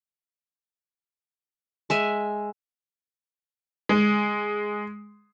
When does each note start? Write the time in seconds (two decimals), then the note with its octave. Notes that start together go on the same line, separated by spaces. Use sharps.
1.90 G#3 E5 G#5
3.89 G#3